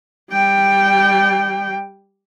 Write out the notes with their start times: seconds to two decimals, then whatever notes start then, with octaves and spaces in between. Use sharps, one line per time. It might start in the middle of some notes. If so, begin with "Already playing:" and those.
0.31 G3 G5